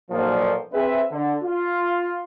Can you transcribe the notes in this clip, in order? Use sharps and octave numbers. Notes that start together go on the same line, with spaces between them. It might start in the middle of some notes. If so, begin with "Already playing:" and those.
B1 A#2 F3 F#3
C4 G#4 B4 E5
D3
F4